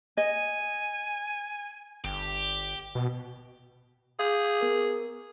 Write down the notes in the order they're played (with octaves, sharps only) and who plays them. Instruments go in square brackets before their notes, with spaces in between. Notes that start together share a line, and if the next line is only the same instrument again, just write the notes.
[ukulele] D#5 [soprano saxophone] G#5
[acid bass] G1 [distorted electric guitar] G4
[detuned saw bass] B2
[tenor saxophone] G#4 [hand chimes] F5 G6
[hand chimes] B3 A#4